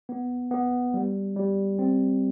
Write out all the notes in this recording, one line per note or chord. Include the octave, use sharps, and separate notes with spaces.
B3
B3
G3
G3
C4